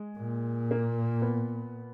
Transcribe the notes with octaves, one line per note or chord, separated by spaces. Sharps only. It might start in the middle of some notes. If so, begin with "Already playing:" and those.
Already playing: G#3
A#2
A#3
B3